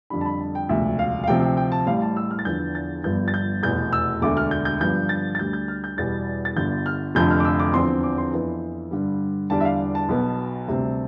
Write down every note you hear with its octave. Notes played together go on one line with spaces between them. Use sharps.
F2 D3 G3 D4 B5
A5
B5
A5
G5
E1 D2 C3 F3 E5
F5
F5
D2 C3 F3 C4 G5
G5
G5
A5
A1 A2 G3 F5
A5
E6
F6
A6
E2 D3 F3 B3 G6
A6
G1 G2 F3 B3 D4 G6
A6
G6
F1 E2 B2 G6
E6
E1 D2 D3 A3 D6
F6
G6
G6
G2 D3 F3 B3 D4 G6
A6
A6
D2 D3 G3 G6
G6
F6
G6
E2 B2 G3 A6
A6
G1 G2 D3 G6
F6
F1 F2 D3 F3 G6
F6
D6
E6
D6
E2 D3 F3 C4 C6
D6
C6
F2 E3 B3 D4
G2 D3 G3
E2 D3 G3 D4 A5
E5
F5
A5
B1 B2 B3
D2 C3 G3 C4